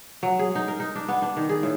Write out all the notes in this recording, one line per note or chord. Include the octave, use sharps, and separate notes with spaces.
F#3
G#4
D#4
A#4
D#4
D4
B3
D4
D#3
G#4
A2